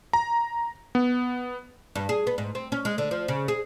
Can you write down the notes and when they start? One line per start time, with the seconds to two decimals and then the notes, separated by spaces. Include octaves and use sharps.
0.13 A#5
0.95 B3
1.95 G2
2.09 G#4
2.27 B3
2.38 G#2
2.55 C4
2.72 C#4
2.85 G#3
2.98 D3
3.11 F3
3.28 C#3
3.48 G#4